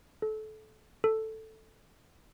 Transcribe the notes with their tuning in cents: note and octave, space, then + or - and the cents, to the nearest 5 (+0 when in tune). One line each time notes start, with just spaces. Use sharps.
A4 -25
A4 +5